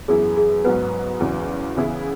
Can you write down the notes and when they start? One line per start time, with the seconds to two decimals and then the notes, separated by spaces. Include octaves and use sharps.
0.08 F#2 E3 B3 E4 G#4
0.37 G#4
0.64 G#2 F#3 B3 B4
1.20 E2 C#3 F#3
1.77 C#3 E3 B3 E4 G#4